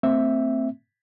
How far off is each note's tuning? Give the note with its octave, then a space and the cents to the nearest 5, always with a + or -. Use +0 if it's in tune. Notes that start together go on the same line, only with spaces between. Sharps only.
A3 +45 C4 +0 E5 +0